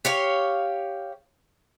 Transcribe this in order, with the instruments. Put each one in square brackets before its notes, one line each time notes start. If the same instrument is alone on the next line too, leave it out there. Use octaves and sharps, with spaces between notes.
[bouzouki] G4 C#5 F5